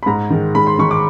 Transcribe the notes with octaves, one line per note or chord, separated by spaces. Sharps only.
B5
G#2 A#5
D#3 G#3
G#2 B5
C6
D#3 G#3 C#6
D6